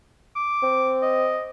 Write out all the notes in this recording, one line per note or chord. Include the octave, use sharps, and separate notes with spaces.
D6
C4
D#5